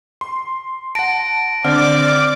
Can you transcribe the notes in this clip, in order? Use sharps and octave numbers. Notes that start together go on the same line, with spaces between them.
C6
F#5 A5 A#6 D7
D3 C4 D5 D6 F6